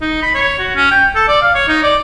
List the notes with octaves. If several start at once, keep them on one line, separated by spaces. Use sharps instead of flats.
D#4
B5
C#5
F#4
C#4
G5
A4
D5
F5
C#5
D#4
D5